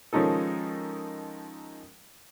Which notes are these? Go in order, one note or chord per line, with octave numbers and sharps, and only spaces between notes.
D#3 F3 G#3 C#4 D#4 A4